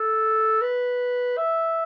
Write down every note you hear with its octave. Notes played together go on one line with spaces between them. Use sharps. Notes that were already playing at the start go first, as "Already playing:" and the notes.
Already playing: A4
B4
E5